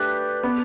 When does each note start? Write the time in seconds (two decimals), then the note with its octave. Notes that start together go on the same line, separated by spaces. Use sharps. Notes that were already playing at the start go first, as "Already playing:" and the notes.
Already playing: A3 D4 G4 B4
0.43 B3